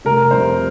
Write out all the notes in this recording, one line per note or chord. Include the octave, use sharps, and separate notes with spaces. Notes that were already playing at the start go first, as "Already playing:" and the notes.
F1 A#4
F2 C3 C5